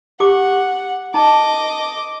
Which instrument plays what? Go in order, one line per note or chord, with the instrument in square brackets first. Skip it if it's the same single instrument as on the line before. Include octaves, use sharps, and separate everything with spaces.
[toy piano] G4 D6 [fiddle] F#5
[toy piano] D#4 A5 [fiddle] D#5 D6